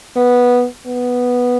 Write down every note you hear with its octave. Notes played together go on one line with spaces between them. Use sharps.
B3
B3